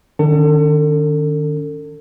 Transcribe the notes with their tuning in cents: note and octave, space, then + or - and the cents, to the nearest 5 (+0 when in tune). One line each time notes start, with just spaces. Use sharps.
D#3 -30 C#4 +35 A4 +35